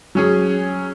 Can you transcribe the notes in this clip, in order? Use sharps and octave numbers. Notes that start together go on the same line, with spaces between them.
F#3 C#4 G#4